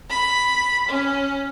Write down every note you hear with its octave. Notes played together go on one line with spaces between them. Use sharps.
B5
C#4